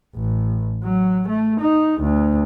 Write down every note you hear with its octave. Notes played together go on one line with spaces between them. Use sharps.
A1
F#3
A3
D#4
D2